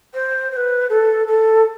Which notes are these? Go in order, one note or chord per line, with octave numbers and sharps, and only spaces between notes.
C5
C5
B4
A4
A4